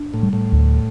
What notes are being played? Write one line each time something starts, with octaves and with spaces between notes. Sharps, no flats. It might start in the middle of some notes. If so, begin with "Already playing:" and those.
Already playing: D4
A2
G3
A2
D2